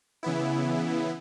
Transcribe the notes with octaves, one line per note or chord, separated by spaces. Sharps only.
C#3 E3 B3 E4